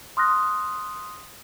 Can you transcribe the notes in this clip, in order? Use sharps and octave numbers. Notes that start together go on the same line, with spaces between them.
C6 D#6 F6 F#6 A#6